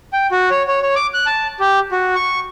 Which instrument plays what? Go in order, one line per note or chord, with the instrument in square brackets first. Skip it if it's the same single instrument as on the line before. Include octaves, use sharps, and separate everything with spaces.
[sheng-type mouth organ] G5
F#4
C#5
C#5
C#5
D6
F#6
A5
G4
F#4
C#6